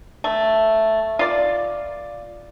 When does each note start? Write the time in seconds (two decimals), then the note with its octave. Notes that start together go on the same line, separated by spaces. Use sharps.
0.24 A3
1.19 F4 D5